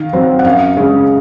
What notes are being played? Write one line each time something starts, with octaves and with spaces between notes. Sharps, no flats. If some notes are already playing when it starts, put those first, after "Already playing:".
Already playing: D#3 F5
F#3 C4
F#5
F#2 F5
C#3 G#3 C#4